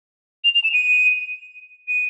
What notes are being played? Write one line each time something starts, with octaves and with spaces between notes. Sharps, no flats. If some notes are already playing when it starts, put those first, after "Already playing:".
F7
F7
E7
D#7
D#7